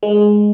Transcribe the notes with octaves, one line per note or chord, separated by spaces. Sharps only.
G#3